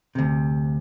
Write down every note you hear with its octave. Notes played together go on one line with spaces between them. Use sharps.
D2 C3